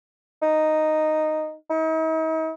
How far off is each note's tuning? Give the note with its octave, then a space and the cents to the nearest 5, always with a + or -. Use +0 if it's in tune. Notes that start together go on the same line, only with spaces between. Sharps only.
D#4 -5
D#4 +45